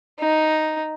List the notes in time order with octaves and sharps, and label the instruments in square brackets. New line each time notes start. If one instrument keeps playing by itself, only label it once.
[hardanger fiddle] D#4